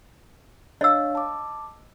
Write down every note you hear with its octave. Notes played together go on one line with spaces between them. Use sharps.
D4 C#5 D#5 F5 E6
A5 D6